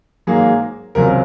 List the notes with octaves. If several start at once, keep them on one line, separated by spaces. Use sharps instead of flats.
G#2 F#3 A#3 G#4
C#2 C3 F#3 C4 A#4